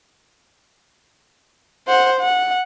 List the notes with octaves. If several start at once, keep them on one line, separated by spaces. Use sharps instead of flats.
C5 F#5
F#5